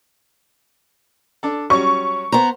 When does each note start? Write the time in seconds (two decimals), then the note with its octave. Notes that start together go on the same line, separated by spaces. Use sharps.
1.43 D4 A4
1.70 F#3 G3 C#4 C#6
2.32 B3 C5 A#5